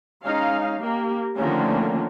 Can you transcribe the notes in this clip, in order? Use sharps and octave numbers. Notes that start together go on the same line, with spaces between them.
G#3 C#4 D#4 F5
A#3 G4
D3 D#3 F3 A3 A#3 C#4